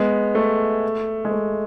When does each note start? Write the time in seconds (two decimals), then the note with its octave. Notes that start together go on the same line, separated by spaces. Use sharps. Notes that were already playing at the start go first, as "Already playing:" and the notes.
Already playing: G#3 B3
0.35 A3
1.25 G#3
1.31 A3